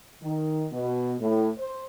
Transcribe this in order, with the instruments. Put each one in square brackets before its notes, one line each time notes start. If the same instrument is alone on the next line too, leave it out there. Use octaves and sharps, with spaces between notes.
[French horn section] D#3
B2
A2
C5